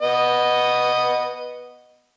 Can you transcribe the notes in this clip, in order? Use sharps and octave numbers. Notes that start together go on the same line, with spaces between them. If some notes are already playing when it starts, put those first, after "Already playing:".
B3 D#5